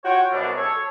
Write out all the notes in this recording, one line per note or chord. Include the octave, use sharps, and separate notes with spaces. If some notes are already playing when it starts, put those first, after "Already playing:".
F4 F#4 C#5 G5
C2 F#2 B2 D4
A4 C#5